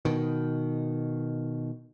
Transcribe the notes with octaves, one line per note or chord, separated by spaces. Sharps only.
B2 D#3